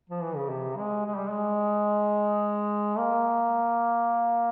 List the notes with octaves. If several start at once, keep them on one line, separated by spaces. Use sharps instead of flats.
F3
E3
C#3
C3
G#3
G#3
G3
G#3
A#3